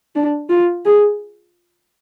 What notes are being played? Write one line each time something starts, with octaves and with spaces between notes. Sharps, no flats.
D4
F4
G#4